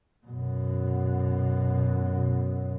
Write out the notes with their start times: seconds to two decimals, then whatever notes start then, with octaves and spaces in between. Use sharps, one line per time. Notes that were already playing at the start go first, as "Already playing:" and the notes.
0.26 F#2 B2